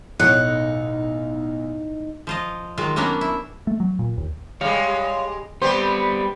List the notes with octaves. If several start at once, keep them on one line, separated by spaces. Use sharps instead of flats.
B1 A2 D#4 G#4 F#5
F3 F4 D#5
D#3 F#3 G#3 F4
F#3 A#3 B3 C#4 D4 A#4
E4
A3
F#3
A#2
D#2
G3 G#3 C#5 F5
G3 B3 C4 G4 C5